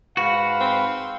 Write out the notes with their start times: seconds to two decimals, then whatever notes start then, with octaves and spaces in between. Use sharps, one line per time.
0.17 G#2 F#4 B4 F5
0.61 C4